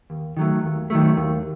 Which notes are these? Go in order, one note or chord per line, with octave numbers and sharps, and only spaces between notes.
D#2
D#3 F#3 A3
D#2
D#3 F#3 A3
D#2